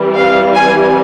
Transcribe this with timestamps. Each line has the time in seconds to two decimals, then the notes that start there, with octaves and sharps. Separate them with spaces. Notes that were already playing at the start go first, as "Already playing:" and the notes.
Already playing: E3 G3 C4
0.16 F5
0.54 G#5